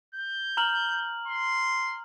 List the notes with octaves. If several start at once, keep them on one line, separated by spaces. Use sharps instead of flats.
G6
A#5 F6 F#7
C6